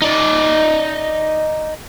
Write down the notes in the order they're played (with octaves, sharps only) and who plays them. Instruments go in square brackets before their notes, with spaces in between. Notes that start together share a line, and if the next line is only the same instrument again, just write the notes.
[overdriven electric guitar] D#4 D5